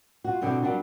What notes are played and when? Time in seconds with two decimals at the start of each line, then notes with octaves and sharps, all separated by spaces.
0.24 F4 F#4
0.41 B2 D3 C4 D4 E4 F#4
0.62 F#3 G3 A#3 D4 F#4